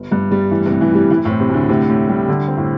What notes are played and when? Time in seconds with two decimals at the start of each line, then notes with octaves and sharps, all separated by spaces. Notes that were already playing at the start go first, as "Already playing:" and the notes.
Already playing: G1
0.11 G1 G2
0.31 G1 G3
0.51 A2 E3
0.66 C3
0.70 A2
0.81 E3
0.91 G3 E4
1.10 E3 E4
1.25 A2
1.30 C4
1.40 C3
1.49 D2 D3
1.69 A2 C3
1.89 A2
2.09 G3
2.29 D3
2.48 C4
2.57 A2